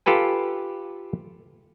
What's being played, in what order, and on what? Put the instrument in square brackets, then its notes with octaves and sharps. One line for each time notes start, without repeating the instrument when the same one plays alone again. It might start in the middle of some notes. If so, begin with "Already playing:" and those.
[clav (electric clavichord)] F4 G4 A4 B4 G#5